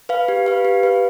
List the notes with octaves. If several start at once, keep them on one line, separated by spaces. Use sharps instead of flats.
B4 F5
G4
B4 F5
G4
B4 F5